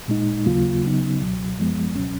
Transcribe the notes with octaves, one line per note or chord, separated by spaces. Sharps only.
A#2 G#3 D#4
D#2 C#3 F#3 A#3 F4
C#3 F#3 B3 D#4
C#2 B2 F#3
F#2 F3 G#3 B3
C#2 B2 F#3 C#4